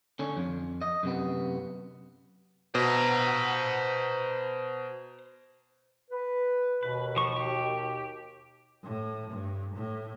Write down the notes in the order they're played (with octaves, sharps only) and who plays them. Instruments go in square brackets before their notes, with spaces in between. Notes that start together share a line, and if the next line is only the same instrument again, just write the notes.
[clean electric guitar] D3 C#4
F2
D#5
F#2 C3 B3
[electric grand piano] B2 [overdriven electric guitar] C5 A#5
[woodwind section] B4
[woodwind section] D#2 B2 [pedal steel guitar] B4
[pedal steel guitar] F3 C#6
G4
[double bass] A2
G2
A2